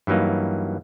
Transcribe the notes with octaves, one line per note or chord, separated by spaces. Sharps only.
G2 E3 F#3 A#3 D#4